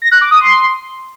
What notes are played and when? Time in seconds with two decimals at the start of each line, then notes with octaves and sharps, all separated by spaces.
0.02 A#6
0.11 F#6
0.21 D6
0.31 D#6
0.41 C6